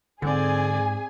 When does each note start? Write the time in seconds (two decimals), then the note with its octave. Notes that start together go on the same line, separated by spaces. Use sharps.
0.22 G#2 D3 C4 G#4 D5 G#5